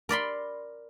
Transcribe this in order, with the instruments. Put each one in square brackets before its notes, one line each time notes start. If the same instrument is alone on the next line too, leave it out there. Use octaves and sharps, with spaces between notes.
[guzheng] A#4 D5 B5 C6